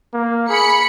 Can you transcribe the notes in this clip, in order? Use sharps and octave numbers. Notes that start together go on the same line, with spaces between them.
A#3
G#4 B5 C#7